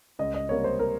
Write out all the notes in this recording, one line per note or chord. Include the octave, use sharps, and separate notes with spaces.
C#2 D#5
D#5
C3 G3 A#3 C#5
C5
A#4